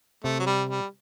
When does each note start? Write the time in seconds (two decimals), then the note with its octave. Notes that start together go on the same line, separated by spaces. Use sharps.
0.24 C3 A3
0.39 F#3
0.47 G3
0.70 G3